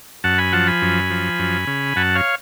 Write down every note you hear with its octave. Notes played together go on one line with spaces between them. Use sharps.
F#2 F#5 A5
G#5 B5
F3 F#5 A5
G#5 B5
F#2
F3
F#2
C#3
F#2 F#5 A5
C#5 F5